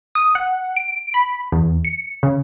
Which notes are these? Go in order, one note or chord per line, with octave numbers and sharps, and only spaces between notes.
D#6
F#5
D7
B5
E2
C#7
C#3